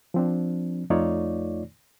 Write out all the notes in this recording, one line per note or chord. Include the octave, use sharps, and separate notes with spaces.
F3 C4 D4
F2 A3 D#4 F4 C#5 D5